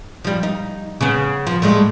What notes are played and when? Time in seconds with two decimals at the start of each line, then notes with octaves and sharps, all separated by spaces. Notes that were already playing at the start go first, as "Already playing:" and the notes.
0.24 F3 G3
0.43 D#4
1.01 C#3 B3
1.47 F3
1.62 A2 G3 G#3